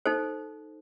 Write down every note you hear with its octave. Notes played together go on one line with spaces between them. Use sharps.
D#4 A4 C5